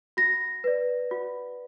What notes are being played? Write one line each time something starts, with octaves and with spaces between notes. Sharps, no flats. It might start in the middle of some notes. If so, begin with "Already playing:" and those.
F#4 A#6
B4 D5
F#4